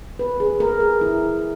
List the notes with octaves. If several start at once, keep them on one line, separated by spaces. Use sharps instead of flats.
B4
G#4
A#4
G#4
E4